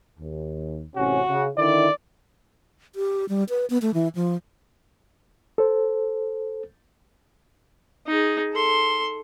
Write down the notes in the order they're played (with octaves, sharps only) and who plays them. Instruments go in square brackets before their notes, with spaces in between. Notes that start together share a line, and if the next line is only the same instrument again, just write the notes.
[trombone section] D#2
[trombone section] A1 C3 C#4 [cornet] F#4
[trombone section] C#3
[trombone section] D3 D#3 E4 [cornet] D5
[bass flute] G4
G3
B4
B3
A3
E3
F3
[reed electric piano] A4 C5
[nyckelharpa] D#4 G#4
A4 C6